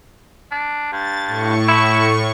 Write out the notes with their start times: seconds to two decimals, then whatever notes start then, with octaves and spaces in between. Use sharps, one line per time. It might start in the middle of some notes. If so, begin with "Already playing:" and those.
0.51 D4
0.92 G2 A6
1.27 A2 C#6
1.68 E4